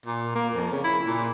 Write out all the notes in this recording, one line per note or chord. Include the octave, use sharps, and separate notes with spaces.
A#2
A#3
F2
C#3
E4
A#2